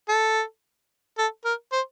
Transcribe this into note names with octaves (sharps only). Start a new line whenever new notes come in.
A4
A4
A#4
C5